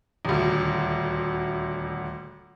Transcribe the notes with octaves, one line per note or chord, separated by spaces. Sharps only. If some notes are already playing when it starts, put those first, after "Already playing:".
D#1 D2